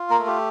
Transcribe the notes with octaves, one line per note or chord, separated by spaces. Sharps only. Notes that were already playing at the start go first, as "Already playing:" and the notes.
Already playing: F4
A#3 A#4
A3
G4